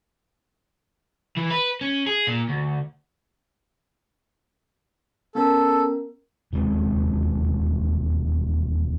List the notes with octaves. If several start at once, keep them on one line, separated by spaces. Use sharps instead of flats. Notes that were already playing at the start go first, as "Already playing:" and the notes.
E3
B4
C#4
G#4
A#2
D2
B3 C#4 A4 A#4
E1 D#2 G#3 C4